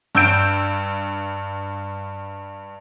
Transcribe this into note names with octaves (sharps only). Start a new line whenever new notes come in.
G2 E6 G6 D7